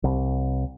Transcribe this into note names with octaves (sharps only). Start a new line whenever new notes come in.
C2